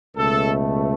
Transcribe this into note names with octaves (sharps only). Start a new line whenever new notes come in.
C#2 B2 A3 A4